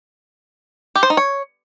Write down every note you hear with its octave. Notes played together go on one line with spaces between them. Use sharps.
G4
C5
D#4
C#5